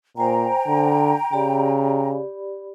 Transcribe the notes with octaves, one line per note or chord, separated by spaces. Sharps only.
A#2 C5 G5 G#5 A#5
D3
C#3 G4 D5 B5